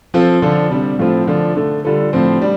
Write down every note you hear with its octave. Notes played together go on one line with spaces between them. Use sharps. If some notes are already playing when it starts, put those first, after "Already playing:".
F3 C4 F4 A4
D3 F3 D4 A4
C3 G3 D4
A2 F3 A3 C4 F4
D3 F3 D4 A4
D3 A3 D4
D3 G3 F4 A4
A2 F3 C4
G3 D4